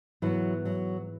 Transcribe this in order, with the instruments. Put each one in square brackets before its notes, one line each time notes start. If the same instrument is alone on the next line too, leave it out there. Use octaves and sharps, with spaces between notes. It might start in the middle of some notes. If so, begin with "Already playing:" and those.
[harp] G#2 E3 B3 E4 B4 [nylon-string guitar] F#3
[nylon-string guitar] F#3